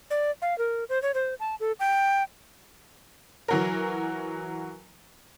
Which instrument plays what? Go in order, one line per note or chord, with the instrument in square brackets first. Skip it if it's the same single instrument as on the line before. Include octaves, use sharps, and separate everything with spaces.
[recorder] D5
F5
A#4
C5
C#5
C5
A5
A4
G5
[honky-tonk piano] E3 F#3 A#4